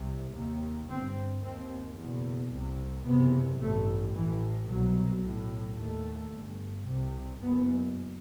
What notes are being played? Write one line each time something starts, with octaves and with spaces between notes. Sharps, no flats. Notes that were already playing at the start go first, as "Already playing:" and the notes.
Already playing: C2 C3
D#2
G1 G2 C4
D#2 C4
F#1 E2 B2
C2 C3
F#1 E2 C3 B3
A1 G2 A3
A1 A2 E3
C2 B2 F#3
B1 A2
D#2 A3
G1 G2
C2 C3
F#1 F#2 B3